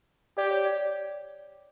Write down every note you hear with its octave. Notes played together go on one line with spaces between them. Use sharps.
G4 D5
C#5
D5